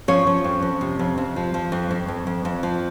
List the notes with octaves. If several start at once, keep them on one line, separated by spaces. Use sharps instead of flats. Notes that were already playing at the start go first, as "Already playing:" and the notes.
F3 C#4 C#5
F3
F2
F2
C3
F2
F2
F3
F3
F2
F2
F2
F2
F2
F3